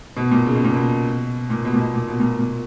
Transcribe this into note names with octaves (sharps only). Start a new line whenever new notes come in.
B2
A#2
C#3
B2
A#2
B2
A#2
B2
A#2
B2
A#2
B2
A#2
A#2